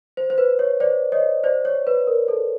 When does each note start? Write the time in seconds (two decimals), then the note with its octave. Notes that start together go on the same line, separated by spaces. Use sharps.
0.17 C5
0.30 C5
0.38 B4
0.59 C#5
0.80 C5 D5
1.12 C#5 D#5
1.44 C5 D5
1.65 C#5
1.87 B4
2.07 A#4
2.28 A4